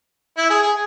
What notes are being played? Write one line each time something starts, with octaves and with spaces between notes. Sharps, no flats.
E4
G#4
G#4